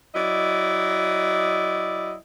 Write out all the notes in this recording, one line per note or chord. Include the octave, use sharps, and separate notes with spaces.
F#3 E4 D5 D#5